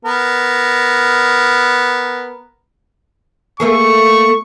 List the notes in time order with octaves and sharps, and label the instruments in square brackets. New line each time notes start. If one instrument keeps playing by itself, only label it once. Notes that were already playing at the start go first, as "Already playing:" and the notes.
[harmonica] B3 A#4
[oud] A3 A#3 G#4 [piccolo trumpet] C#6